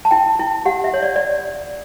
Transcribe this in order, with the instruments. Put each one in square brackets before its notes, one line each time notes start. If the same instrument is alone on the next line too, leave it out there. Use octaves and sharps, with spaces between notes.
[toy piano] A5
E4 G5
E4
G4 F#5
E5
C#5
D5
D5